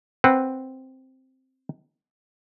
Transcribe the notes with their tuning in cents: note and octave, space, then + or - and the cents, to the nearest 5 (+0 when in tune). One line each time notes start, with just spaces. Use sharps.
C4 +0 B4 +0 F#5 +10